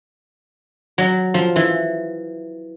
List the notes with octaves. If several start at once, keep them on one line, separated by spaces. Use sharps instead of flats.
F#3
F3
E3